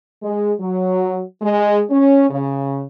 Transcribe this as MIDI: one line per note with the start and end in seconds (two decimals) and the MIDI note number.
0.23 0.51 56
0.61 1.22 54
1.42 1.82 56
1.90 2.27 61
2.30 2.84 49